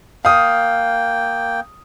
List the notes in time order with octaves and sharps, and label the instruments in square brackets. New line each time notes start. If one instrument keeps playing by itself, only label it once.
[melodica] A#3 G5 [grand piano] F5 D#6